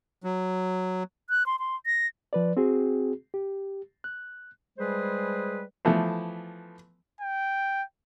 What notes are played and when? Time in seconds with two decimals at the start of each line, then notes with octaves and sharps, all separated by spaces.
0.24 F#3
1.30 F#6
1.46 C6
1.59 C6
1.86 A#6
2.33 F3 B4 D5
2.57 C4 F#4 G#4
3.34 G4
4.04 F#6
4.78 G3 G#3 G#4 B4 C5
5.85 E3 F3 A3 B3
7.21 G5